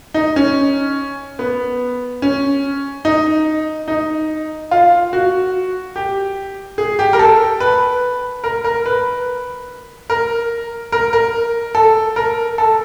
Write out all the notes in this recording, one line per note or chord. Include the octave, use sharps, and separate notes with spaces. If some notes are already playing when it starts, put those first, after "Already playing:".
D#4
C#4
B3
C#4
D#4
D#4
F4
F#4
G4
G#4
G4
A#4
A4
B4
A#4
A#4
B4
A#4
A#4
A#4
A4
A#4
A4